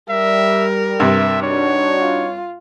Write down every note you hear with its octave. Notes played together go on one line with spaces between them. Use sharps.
G3 A#4 E5
G2 C3 E5
D4 D#4 F#4 C#5
F4